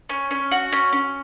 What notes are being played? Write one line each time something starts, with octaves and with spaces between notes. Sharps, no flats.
C#4
C#4
F#4
C#4
C#4